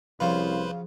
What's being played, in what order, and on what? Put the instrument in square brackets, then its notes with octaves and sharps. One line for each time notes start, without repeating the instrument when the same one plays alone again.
[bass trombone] C2 [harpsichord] C#3 F4 [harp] F3 F#4 G#4 [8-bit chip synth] B4 C5